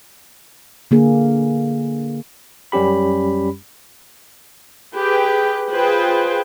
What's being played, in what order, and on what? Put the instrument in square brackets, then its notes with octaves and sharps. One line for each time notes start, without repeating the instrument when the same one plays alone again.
[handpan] D3 A#3 G#4
[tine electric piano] F#2 G3 C#4 G4 B5
[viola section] G4 G#4 B4 G5
F4 G#4 B4 C5 G5